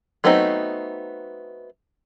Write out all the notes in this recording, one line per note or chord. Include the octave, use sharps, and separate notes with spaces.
F#3 A3 B3 C4 D#4